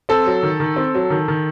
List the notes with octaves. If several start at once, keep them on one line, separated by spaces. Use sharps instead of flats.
C4 A4
F#3
D#3
D#3
C4
F#3
D#3
D#3